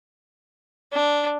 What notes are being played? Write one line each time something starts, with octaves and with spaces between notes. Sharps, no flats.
D4